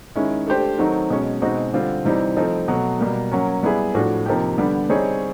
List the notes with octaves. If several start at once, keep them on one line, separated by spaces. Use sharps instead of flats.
D#3 G#3 C#4 E4
A3 D4 G4 C5
D#3 F#3 A3 C4 D#4
B2 G#3 C#4
B2 G#3 C4 D#4 F#4
D3 G3 C4 F4
C3 E3 G3 C4 D#4
F3 A3 C4 D#4
B2 F#3 A3
B2 G3 A#3
F#3 A#3 C#4
G3 B3 E4 G#4
A2 F3 A3 D4 F#4
C3 F3 A#3 D#4 G4
D3 G3 B3 D4
G3 C4 D#4 G#4 C#5